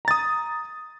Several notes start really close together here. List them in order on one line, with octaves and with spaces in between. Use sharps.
A#5 A6 D#6